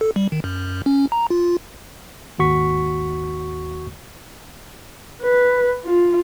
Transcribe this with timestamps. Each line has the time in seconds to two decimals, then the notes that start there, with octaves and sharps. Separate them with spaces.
0.01 A4
0.16 G3
0.32 D#3
0.44 F#2
0.86 C#4
1.12 A#5
1.30 F4
2.38 G#1 D#2 F#4 C#6 B6
5.22 B4
5.86 F4